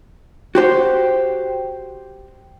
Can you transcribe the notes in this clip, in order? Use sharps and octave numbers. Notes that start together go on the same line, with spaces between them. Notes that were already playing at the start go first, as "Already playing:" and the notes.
F#4 G4 C5